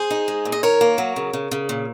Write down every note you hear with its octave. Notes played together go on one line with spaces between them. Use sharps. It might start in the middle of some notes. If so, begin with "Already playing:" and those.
Already playing: G#4 C5
D#4
G#3
A#2
D#5
D#3 A#4 C#5
A#3
F#3
C#3
C#3
C#3
A#2